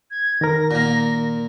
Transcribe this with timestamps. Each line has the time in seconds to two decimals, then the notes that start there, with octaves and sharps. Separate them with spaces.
0.11 G#6
0.41 D#3 A#4 A#6
0.71 A#2 A#3